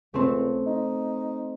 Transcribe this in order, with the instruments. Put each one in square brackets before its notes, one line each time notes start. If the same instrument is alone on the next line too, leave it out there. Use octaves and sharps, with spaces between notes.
[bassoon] C#2 [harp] A3 C4
[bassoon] D#4